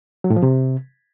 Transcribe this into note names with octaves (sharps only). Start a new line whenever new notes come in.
F#3
A2
F3
C3